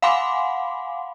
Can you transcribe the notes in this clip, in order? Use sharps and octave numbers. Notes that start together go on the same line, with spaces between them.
F5 F#5 G#5 B5 C6 D6